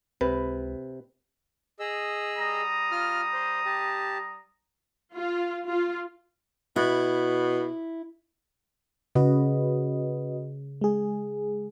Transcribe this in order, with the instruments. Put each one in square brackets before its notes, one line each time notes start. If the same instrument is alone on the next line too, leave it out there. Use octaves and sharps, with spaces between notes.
[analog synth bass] C#2 [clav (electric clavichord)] C3 [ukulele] B4
[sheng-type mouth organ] G#4 D#5 E6
[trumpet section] G3 A#5 D#6
[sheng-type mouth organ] F4 F6
C5
G4 A5
[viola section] F4
F4
[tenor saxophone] B2 [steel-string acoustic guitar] E4
[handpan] C#3 [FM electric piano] F#4 B4 D#5
[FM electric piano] G#3 G#4